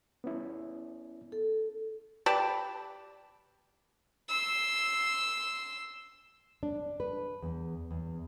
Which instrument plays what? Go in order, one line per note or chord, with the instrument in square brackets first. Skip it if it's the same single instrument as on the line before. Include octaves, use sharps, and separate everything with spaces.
[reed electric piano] B3 C#4 E4
[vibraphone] A4
[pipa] G4 B4 D5 A5
[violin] C6 E6
[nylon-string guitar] D4
B4
E2
E2